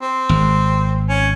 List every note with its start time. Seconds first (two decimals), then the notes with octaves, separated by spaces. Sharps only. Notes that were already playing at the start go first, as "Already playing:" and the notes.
0.02 C4
0.29 G#1
1.09 C#4